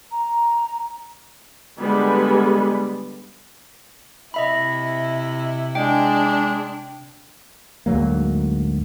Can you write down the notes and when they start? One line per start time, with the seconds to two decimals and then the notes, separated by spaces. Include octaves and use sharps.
0.12 A#5
1.79 D3 G3 G#3 B3 B5
4.34 C3 E4 D#5 E5 B5
5.75 G#3 D4 G5
7.86 D2 G#2 F#3 A#3